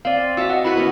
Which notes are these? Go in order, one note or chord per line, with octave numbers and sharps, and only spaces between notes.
C4 D5 F5
F#4 E5 A5 E6
D#5 F#5
E4 F#4 B4 B5
B3 C#4